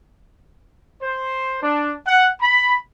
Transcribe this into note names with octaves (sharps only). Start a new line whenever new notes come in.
C5
D4
F#5
B5